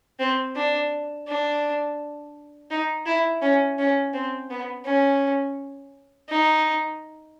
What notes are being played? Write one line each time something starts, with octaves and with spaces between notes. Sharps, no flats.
C4
D4
D4
D#4
E4
C#4
C#4
C4
B3
C#4
D#4